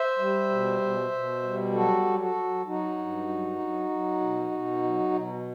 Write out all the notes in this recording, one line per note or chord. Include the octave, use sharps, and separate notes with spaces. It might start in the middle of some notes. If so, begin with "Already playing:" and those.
Already playing: C5 E5
G3
B2
B2
B2
G3
F#3 F#4 A4
F#3
F#4 A4
F#3
F#3 D#4 F#4
G2
F#3
F#3
F#3
B2
B2
F#3
B2